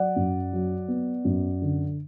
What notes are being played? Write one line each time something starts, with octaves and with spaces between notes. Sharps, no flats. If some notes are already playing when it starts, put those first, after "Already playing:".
Already playing: F#3 D5 F#5
F#2
F#3
B3
F#2
D3